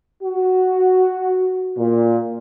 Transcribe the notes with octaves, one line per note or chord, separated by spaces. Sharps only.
F#4
A#2